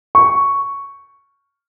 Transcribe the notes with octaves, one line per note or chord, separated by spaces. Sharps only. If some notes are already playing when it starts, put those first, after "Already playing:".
C#6